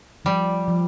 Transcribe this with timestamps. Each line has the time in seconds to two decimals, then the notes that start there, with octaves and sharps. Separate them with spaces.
0.25 F3 G3
0.68 F3